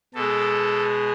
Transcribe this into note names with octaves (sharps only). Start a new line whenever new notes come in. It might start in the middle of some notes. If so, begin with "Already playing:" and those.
B2 G#3 A4